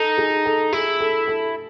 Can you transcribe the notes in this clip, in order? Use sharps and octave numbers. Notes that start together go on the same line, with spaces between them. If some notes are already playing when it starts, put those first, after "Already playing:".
Already playing: D#4 A4
G#4
A4
E4 G#4
A4
A4